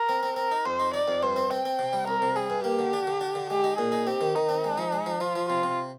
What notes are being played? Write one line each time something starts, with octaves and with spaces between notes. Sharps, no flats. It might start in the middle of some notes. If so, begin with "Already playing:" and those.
Already playing: A#4
C4
C4
C4 A#4
D#4
F2 C5
D#4
D#4 D5
F2
G2 C5
C4
C4 G5
C4
C3
G3
C2 A#4
C3
G3 G#4
G2
A#3 G4
D3
D4
D3
D4
D3
G#3 G4
D#4
A#2 G#4
D#4
C4 G4
D#3
D#3 D#4
C4
G#3
F3
G#3
F3
F3 F4
F3
C3 F4
C3